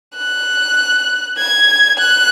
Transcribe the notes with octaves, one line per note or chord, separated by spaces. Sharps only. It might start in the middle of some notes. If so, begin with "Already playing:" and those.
F#6
G#6
F#6